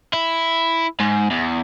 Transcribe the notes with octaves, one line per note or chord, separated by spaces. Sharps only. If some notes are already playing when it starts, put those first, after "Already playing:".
E4
G#2
E2